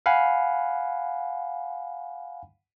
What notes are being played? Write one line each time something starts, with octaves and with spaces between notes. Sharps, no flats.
F5 F#5 G#5 B5